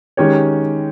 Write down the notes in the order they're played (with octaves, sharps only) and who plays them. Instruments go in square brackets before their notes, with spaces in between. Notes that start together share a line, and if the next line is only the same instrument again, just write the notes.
[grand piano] D#3 G#3 C#4 G4 C#5